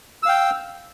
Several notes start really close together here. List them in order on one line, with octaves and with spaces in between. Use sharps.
E6 F5 G5